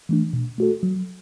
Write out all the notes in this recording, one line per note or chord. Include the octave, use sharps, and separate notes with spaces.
E3 A3 D4
B2
A3 F#4 A4
F#3